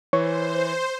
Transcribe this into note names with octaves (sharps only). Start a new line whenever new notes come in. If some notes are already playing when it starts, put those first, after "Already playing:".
E3 C5 C#5